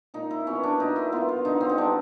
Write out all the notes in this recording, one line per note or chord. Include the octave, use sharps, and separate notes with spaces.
A#2 D#4
E4
F#3 B3 C#4
D4
A#2 D#4
E4
F#3 B3 F4
F4
D3 D#4
C4
D#4
G3 B3 D4